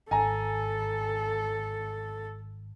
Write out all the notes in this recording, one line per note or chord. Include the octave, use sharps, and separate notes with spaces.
G#1 A4 G#5 A#5